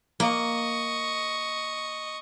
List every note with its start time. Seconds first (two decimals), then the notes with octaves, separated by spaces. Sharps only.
0.20 A#3 D#5 C#6